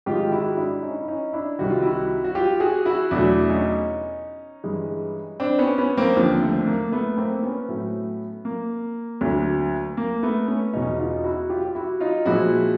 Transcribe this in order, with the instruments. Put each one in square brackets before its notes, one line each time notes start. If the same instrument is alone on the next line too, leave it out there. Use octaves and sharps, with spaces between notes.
[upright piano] G#2 D#3 G#3 F4 G4
E4 F#4
D4 E4
C#4 D#4
E4
C#4 D#4
D4 E4
C2 C3 D#3 F#4
F4
E4 F#4
F#4
F4 G4
F#4 G#4
E4 F#4
E2 B2 F#3 A3 D4 E4
C#4 D#4
G2 E3 G#3
C4 D4
B3 C#4
B3 C#4
A#3 C4
D#2 D3 F3
A3
A#3
A3 B3
A#3 C4
C4
B3 C#4
A2 F#3 A3
A#3
D2 D3 F#3
A#3
A3 B3
B3 C#4
E2 B2 G#3 C#4 D#4
D#4 F4
E4 F#4
F4 G4
G4
E4 F#4
D#4 F4
A#2 F3 G#3 E4 F#4